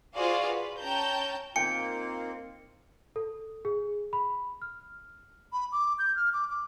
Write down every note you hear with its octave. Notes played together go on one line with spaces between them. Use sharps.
F4 F#4 G#4 C5 D5 F5
B4
C#4 G5 A5 A#5 G6
A#3 C4 D#4 F4 G5 C#7
A4
G#4
B5
F6
B5
D6
G6
F6
D6
D6